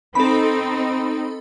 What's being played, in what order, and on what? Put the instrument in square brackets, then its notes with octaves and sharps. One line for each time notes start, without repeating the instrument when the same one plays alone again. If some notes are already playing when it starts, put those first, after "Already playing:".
[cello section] C4 D#4 [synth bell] A4 B5